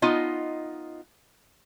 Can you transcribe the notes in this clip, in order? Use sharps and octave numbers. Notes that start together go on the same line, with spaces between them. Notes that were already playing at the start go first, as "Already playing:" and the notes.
B3 D#4 F4 D#5